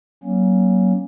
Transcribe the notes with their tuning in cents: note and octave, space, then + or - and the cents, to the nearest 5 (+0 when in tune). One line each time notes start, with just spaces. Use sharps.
F#3 +25 A#3 +25 C#4 -10